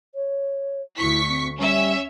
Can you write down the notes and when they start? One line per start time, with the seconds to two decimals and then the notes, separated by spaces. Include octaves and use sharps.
0.15 C#5
0.97 D2 E4 C#6 B6
1.28 C4
1.59 G3 C#4 E5